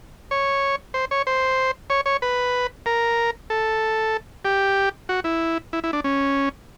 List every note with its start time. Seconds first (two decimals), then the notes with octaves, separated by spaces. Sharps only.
0.31 C#5
0.94 C5
1.11 C#5
1.27 C5
1.90 C#5
2.06 C#5
2.22 B4
2.86 A#4
3.50 A4
4.45 G4
5.09 F#4
5.24 E4
5.73 E4
5.84 E4
5.93 D4
6.04 C#4